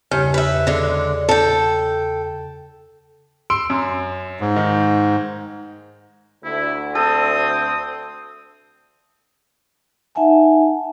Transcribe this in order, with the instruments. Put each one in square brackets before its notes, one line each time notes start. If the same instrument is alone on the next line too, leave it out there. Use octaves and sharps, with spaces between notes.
[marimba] E2 C#3 C#5 [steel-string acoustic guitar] G2
[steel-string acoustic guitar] B4 E5
D3 G#3
A4 G5
[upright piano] C6 E6 D7
F#2
[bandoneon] G#2
[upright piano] D#3
[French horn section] D2 [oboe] E4
[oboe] C4 [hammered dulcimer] A4 [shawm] D#6
[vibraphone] D#4 E5 F#5 G#5 A5